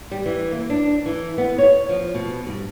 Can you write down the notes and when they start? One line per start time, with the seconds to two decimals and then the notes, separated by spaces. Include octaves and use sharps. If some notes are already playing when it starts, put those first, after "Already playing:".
0.11 G3
0.26 E3
0.52 A#3
0.70 D4
1.06 E3
1.38 B3
1.58 C#5
1.89 F3
2.14 B2
2.47 G2